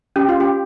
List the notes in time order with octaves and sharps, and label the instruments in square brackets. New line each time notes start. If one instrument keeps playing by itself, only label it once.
[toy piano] C#4 [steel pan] G4
[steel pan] F4
G4